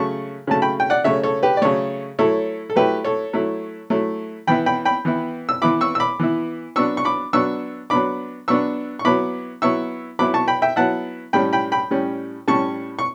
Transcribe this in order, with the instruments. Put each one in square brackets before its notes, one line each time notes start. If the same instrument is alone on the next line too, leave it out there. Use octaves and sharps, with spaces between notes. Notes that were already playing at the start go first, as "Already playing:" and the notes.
Already playing: [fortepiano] C#3 F#3 A3 A5 C#6
C#3 F#3 A3 A5
G5 B5
G5
D5 F#5
C#3 F#3 A3 C#5 E5
A4 C#5
G4 B4
D5
C#3 F#3 A3 A4 C#5
F#3 A3 E4 A4 C#5
A4
F#3 A3 E4 G4 B4
A4 C#5
F#3 A3 E4
F#3 A3 E4
E3 B3 E4 G5 B5
G5 B5
G5 B5
E3 B3 E4
E6
E3 B3 E4 B5 D6
C#6 E6
E6
B5 D6
E3 B3 E4
F#3 B3 D4 C#6 E6
C#6
B5 D6
F#3 B3 D4 C#6 E6
F#3 B3 D4 B5 D6
F#3 B3 D4 C#6 E6
C#6
F#3 B3 E4 B5 D6
F#3 B3 E4 C#6 E6
F#3 B3 E4 B5 D6
A5 C#6
G5 B5
E5 G5
F#3 B3 E4 F#5 A5
A2 G3 C#4 G5 B5
G5 B5
G5 B5
A2 G3 C#4
A2 G3 C#4 A5 C#6
C#6